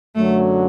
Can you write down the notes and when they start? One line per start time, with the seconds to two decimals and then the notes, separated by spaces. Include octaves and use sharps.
0.15 F#2 D3 F#3 A3